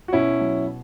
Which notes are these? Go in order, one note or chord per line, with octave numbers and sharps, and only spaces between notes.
F#4
B2 C#4 E4
F#3